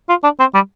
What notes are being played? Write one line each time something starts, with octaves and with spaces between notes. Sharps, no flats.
F4
D4
C4
G3